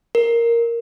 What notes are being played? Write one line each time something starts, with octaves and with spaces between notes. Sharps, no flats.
A#4